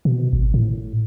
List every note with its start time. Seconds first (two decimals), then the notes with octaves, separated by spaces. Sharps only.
0.05 B2
0.33 G#1
0.54 A2